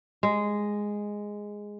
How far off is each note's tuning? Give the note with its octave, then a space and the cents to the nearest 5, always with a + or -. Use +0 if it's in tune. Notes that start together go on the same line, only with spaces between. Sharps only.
G#3 -5